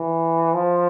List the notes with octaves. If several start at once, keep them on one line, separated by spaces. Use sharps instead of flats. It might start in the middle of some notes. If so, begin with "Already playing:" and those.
Already playing: E3
F3